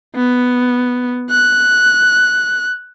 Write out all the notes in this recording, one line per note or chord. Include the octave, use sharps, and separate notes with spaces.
B3
F#6